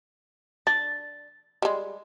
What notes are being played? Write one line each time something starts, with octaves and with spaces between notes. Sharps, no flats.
D4 A6
G3 G#3